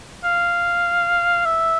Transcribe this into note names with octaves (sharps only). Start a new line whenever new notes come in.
F5
E5